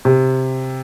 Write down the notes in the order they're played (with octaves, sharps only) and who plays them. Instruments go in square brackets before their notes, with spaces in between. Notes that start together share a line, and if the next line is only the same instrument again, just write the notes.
[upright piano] C3